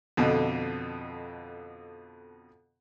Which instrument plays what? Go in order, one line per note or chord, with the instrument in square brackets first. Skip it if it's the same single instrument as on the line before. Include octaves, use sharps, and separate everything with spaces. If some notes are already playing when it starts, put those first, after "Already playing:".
[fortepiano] F2 B2 D3